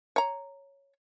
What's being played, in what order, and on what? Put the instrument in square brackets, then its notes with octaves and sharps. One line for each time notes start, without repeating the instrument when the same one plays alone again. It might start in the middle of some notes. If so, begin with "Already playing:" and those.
[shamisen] C#5 A#5